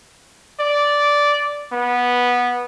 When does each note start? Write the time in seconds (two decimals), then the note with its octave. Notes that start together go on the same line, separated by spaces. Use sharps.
0.60 D5
1.72 B3